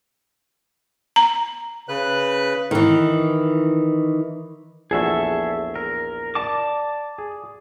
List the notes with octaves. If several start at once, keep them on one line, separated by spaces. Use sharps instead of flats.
A#5
C#3 B4 F#6
D#3 E3
A#1 E2 F#4 G#4 A4 E5
A#4
D5 A5 D6
G#4